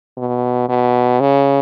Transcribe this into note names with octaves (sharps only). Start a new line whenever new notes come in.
B2
B2
C#3